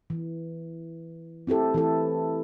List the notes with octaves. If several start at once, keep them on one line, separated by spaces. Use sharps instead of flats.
E3
C4 E4 G4 A4
E3 E4 A4